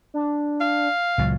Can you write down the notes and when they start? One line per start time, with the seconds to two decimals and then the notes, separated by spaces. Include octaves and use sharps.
0.14 D4
0.61 F5
1.18 C#2 A#2 F#3